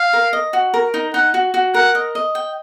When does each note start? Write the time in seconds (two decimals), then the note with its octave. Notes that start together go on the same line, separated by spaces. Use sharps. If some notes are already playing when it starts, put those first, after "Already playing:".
Already playing: F5
0.13 A#4
0.33 D#5
0.53 F#4
0.74 A#4
0.94 D#4
1.14 D#4 F#5
1.34 F#4
1.54 F#4
1.74 A#4 F#5
1.95 D#5
2.15 D#5
2.35 G5